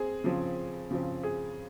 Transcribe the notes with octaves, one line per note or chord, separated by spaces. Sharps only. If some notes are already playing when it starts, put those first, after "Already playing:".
Already playing: C4 G#4
C#3 F3 C4
C#3 F3 C4
G#4